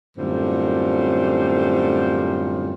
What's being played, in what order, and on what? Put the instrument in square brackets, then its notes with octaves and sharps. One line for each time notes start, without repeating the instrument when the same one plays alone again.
[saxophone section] F#2 A2 D3 G3 C4 F4